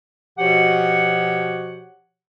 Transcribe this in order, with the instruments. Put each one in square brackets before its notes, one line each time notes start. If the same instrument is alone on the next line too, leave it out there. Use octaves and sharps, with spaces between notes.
[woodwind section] B2 F3 F#4 G4 C#5 F#5